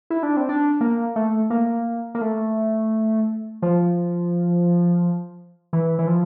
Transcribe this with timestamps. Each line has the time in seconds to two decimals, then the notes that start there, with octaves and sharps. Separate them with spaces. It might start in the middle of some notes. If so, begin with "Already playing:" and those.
0.10 E4
0.23 D4
0.37 C4
0.49 D4
0.81 A#3
1.16 A3
1.50 A#3
2.15 A#3
2.21 A3
3.62 F3
5.73 E3
5.99 E3
6.07 F3